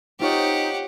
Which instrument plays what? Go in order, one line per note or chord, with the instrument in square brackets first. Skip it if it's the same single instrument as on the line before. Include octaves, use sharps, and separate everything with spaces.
[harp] C4 F4 C#5 [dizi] D#4 [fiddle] G4 F#5